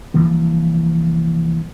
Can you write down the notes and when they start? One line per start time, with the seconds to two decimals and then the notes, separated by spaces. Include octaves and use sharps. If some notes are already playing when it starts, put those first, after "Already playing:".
0.14 C2 E3 F3 A#3